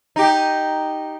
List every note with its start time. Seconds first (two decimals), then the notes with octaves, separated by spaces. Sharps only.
0.16 D#4 G4